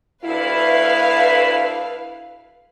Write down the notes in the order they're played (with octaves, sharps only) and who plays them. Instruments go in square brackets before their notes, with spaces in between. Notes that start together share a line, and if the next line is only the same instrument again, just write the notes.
[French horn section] D2 E4 [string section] B4 F5